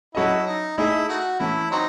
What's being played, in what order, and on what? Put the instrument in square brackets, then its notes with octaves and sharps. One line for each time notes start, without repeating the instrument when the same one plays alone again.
[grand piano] F#3 C#4 F#4 A4 D#5 [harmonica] E4
[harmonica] D#4
[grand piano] A3 D#4 G#4 D#5 [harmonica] E4
[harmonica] A3 D#4 F#4
[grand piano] E3 A3 C#4 [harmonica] E4
[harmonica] F#3 C4 D#4